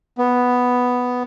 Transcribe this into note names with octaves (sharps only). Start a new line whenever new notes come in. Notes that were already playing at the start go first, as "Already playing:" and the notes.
B3